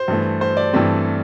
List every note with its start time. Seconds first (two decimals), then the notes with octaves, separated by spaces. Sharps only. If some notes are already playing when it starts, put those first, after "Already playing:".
Already playing: C5
0.08 G2 E3 A3
0.41 C5
0.57 D5
0.73 G2 E3 A3 C4